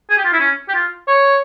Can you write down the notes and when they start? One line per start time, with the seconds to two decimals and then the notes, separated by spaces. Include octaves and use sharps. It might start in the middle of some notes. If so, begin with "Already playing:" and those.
0.10 G#4
0.17 G4
0.25 F4
0.33 E4
0.40 C#4
0.69 G4
0.74 F4
1.07 C#5